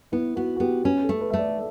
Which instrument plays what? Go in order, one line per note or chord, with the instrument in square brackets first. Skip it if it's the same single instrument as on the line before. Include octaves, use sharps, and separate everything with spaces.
[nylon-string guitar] B3 [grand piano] E4
[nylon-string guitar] B3 [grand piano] F#4
[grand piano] F#4
[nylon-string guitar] B3 [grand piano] G4
[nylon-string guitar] C#4 [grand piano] B4
[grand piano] A4
[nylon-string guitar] A3
[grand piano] B4
[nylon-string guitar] A3 [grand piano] E5
[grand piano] D5